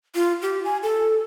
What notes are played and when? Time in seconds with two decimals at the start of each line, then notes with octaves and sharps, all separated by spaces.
0.15 F4
0.42 G4
0.64 G#5
0.83 A4